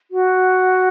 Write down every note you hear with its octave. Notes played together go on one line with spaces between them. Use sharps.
F#4